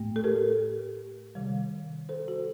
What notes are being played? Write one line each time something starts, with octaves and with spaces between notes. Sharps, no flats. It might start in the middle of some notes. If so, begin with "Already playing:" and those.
Already playing: A2 A3
A4
G4 A#4
C3 D#3 G3
A4 C5
F#4